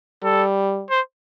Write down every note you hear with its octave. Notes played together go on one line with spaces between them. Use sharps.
G3 A4
C5